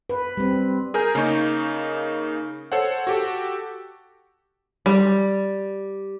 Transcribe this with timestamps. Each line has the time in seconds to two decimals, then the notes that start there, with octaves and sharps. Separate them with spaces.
0.10 B4
0.37 G3 C4
0.94 G#4 A#4 G#5 A#5 G6
1.15 C#3 A#3 D#4 C#6
2.72 A4 C5 C#5 F#5
3.07 F#4 G4 A4
4.86 G3